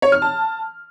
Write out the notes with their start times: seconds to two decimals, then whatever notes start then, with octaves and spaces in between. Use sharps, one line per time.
0.02 C#5
0.12 F6
0.22 A5